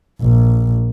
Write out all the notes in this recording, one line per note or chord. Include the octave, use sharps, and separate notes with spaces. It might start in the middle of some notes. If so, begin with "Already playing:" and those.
A#1